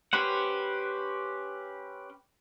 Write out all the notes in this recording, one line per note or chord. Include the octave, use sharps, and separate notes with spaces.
C#4 G4 B4 C5 F#5